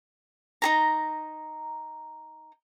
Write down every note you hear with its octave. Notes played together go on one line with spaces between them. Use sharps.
D#4 G#4 A#5